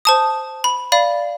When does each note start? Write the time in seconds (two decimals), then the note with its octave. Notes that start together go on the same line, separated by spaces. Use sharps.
0.05 C5 A5 D#6
0.64 B5
0.92 D5 F5 B5